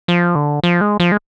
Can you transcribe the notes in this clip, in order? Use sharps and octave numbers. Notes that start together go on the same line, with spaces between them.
F3
D3
F3
G#3
F3
G#3